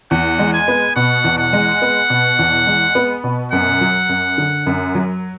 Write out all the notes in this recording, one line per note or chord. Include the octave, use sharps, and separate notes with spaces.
E2 F#5
G#3
G#5
B3
B2 F#5
E2
F#5
G#3
B3
B2
E2
G#3
B3
B2
F#2 F#5
F#3
F#2
D3
F#2
F#3